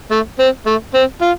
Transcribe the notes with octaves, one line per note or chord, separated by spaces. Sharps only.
A3
C4
A3
C4
F4